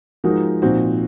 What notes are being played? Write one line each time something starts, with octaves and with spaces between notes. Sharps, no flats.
F3 G#3 D#4 F#4 A#4
A#2 F3 C4 D#4 F#4